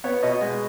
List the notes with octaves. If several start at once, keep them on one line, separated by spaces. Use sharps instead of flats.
B3 C#5
B2 D#5
G#3